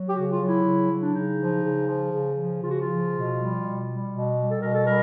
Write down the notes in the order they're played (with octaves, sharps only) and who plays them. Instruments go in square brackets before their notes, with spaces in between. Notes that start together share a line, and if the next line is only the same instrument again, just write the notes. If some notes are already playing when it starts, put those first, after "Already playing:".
Already playing: [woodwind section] F#3
G4
C#3 F#4
F4
F#3
E4
C#3
F#3
D4
C#3 D#4
F3
C#3
F3
C#3
F3
C#3 F4
F#4
F4
F3
B2
G3
B2
G3
B2
G3
A4
B2 A#4
A4
G3 A#4